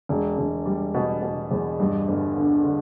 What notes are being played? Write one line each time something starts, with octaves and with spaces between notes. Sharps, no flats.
E1
E1
G3
B2
B2
E2
G2
G1
D3
D3